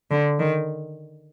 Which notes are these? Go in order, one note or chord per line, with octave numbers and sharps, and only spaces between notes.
D3
D#3